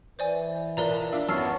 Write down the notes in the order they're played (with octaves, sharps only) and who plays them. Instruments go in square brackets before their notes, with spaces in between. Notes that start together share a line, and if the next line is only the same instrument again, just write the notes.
[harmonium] E3 [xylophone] C5 D5 G#5
[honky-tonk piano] B1 A#2 B4 [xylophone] A#4 D5 A#5
[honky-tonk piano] D4 F4 E5
[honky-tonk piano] A1 F#2 [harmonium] B3 C#5 A5 [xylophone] E6 F6 C7